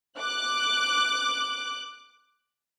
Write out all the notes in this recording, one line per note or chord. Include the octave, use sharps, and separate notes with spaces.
D6 F#6